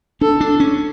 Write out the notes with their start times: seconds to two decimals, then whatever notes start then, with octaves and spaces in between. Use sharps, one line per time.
0.21 D4 A4
0.41 D4
0.60 C#4